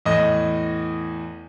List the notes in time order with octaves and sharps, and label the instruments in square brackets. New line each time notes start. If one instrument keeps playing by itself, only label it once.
[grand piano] E2 A2 D#5